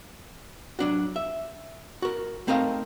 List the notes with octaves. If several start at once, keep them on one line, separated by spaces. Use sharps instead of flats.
F#3 D4 F#4
E5
F#4 A#4
A3 C4 D#4 A#4 D#5 F5